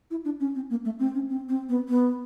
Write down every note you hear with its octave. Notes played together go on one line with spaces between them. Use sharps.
E4
D4
C#4
C4
A#3
A3
C4
C#4
C4
C4
B3
B3